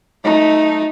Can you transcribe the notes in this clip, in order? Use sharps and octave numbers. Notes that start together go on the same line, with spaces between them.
A3 D#4